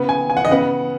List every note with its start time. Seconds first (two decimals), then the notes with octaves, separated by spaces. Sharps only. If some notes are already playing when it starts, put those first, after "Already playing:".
Already playing: C#3 B3
0.09 G#5
0.30 G#5
0.37 F#5
0.45 D#5
0.49 C#3 B3 F#5